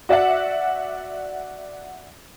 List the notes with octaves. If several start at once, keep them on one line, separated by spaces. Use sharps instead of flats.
F#4 D5 E5 F#5